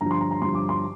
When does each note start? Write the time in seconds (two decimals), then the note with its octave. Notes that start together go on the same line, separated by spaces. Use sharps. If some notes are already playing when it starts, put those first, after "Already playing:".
0.01 G2 D3 F3 A#5
0.11 C6
0.21 A#5
0.31 A#5
0.42 G2 D3 F3 C6
0.55 D6
0.69 C6